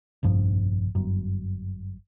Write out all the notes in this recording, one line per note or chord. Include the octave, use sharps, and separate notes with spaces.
F1 A#1 G2 F3
G1 F#2